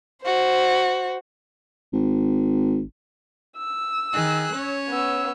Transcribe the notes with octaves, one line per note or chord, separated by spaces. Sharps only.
F#4 C5
G#1
E6
D#3 G#4 F#6
C#4 C#5
B3 E6